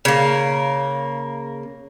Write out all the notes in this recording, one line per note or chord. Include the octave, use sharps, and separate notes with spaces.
C#3 A#3